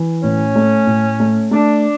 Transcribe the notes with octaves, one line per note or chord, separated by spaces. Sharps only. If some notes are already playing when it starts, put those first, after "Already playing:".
Already playing: E3
A2 C#4
A3
A2
A3
A3 D4